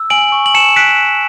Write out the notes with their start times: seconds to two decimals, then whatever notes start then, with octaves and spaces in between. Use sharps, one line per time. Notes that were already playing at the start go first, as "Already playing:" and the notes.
Already playing: E6
0.10 G#5 D7 F#7
0.32 C#6
0.46 F#7
0.54 A5 C#7 E7
0.76 F#6 B6 D7